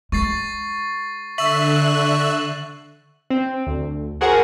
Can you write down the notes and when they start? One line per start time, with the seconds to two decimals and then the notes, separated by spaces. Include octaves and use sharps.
0.12 G#3 C#6 A6 C7
1.38 D3 E5 C#6 E6 F#6 F#7
3.30 C4
3.67 D2
4.21 F#4 G#4 A#4 C5 F#5